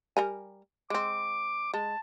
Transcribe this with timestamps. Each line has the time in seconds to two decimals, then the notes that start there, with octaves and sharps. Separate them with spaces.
0.17 G3 A#4 G#5
0.90 G#3 C4 D6
1.74 G#3 A5